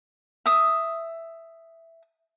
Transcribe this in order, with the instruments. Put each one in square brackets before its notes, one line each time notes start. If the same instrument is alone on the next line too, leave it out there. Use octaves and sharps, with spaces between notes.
[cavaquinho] E5 D#6